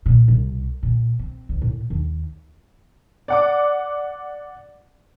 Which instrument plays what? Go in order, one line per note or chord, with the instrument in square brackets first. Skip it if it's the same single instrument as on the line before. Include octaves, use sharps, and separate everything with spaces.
[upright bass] A#2
C2
A#2
C4
D2
A2
D#2
[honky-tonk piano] D5 F#5 D6